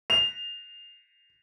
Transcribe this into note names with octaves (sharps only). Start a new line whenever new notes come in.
F7